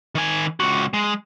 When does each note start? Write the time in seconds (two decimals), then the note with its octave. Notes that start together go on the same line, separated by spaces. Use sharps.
0.15 D#3 G#5
0.60 C#2 F#4
0.94 G#3